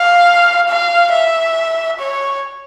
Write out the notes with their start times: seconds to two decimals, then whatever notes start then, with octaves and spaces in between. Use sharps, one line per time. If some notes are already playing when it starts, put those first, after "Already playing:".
Already playing: F5
0.68 F5
1.12 E5
1.99 C#5